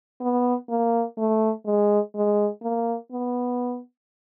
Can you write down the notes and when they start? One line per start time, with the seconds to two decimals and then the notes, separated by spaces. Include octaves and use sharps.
0.21 B3
0.70 A#3
1.18 A3
1.65 G#3
2.15 G#3
2.62 A#3
3.12 B3